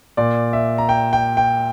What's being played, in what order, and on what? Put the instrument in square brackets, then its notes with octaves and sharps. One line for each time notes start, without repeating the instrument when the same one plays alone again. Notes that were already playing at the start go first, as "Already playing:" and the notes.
[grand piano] A#2 D5
E5
A#5
G5
G5
G5